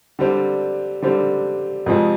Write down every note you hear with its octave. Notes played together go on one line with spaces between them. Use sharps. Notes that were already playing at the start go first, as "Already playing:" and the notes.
D3 G3 C4
D3 G3 C4
F2 C3 F3 G#3 C4